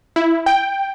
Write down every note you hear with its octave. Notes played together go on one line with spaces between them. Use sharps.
E4
G5